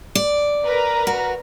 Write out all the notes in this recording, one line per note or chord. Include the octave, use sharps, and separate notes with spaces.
D5
A#4 B4 A#5
F#4